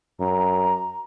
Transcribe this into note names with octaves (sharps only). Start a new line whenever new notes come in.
F#2 A#5